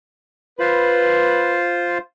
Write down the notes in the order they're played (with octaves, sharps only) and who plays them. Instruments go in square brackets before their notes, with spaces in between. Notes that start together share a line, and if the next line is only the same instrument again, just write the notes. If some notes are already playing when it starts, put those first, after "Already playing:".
[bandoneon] F4 C5 [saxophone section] B4